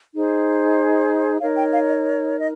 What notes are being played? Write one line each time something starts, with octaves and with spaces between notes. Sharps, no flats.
D#4 G#4 C5
D#4 A#4 C#5 F5
G5
F5
D#5
D#5